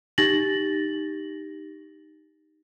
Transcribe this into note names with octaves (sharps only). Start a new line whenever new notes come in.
D#4 G4 A6 A#6 F#7